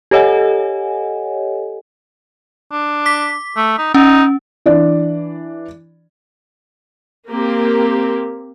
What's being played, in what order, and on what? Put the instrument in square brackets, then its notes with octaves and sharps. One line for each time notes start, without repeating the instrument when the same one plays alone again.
[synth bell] G4 A4 C#5 D#5 F#5 G#5
[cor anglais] D4
[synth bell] D6 B6
[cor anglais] A3
D#4
[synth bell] C#4 [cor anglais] D#4
[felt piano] E3 D4 D5
[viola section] A#3 C4 G4 A#4